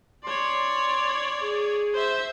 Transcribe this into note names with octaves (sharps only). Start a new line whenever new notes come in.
C#5 D5 C6
G#4
C5 E5